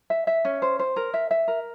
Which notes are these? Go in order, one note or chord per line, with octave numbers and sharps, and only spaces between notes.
E5
E5
C#4
C5
C5
A#4
E5
E5
A#4